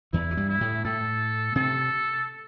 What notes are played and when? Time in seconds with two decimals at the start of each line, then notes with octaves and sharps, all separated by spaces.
0.13 E2 E3 E4
0.31 E3
0.37 G2 G3
0.49 E4
0.61 A2 A3
0.85 A2 A3 A4
1.56 C3 C4 A4